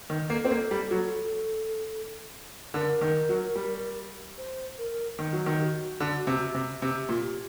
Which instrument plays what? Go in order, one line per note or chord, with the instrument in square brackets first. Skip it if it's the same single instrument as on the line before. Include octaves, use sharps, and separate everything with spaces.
[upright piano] D#3
[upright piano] A#3 [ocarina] A4
[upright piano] C4
A#3
G3
F#3
[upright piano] D3 [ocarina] A#4
[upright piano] D#3
F#3
G3
[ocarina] C5
A#4
[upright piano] D#3
F#3
D#3
[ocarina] G4
F#4
[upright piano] D3
C3
C3
[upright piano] C3 [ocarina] G4
[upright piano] A#2
[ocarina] G4